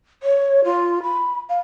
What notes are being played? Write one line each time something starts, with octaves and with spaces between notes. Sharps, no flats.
C#5
F4
B5
F5